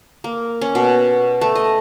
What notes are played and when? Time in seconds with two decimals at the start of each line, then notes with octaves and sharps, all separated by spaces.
0.24 A#3
0.61 C#4
0.75 B2
1.41 A3
1.55 D#5